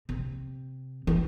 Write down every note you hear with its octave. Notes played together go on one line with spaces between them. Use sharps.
C3
E3